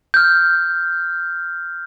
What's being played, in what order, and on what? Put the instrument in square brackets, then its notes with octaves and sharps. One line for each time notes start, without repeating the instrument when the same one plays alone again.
[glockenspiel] F6 G6